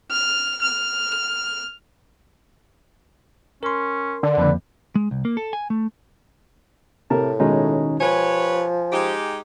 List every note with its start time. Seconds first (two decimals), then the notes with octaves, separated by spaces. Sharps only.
0.11 F6
0.62 F6
3.63 C#4 A#4 C6
4.23 D3 D5
4.37 F2 F3 A#3 B4
4.95 G#3
5.11 C2
5.25 A#3
5.37 A4
5.53 G#5
5.70 A3
7.10 A2 C3 A#4 A5
7.40 B2 D#3 G#3 C#4 D#4
8.00 F3 G4 B4 C#5 G#5
8.93 G#3 D#4 G4